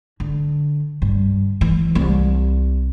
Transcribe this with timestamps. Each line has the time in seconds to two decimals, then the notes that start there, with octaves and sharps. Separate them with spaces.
0.20 D3
1.02 G2
1.61 E3
1.95 C2